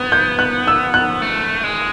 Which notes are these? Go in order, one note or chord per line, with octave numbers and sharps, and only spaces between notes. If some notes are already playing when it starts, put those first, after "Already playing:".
Already playing: B3 G#6
G6
F#6
E6
F#6
A3
G#3